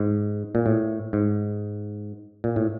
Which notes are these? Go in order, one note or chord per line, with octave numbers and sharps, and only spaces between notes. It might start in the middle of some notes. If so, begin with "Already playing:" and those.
Already playing: G#2
A#2
A2
G#2
A#2
A2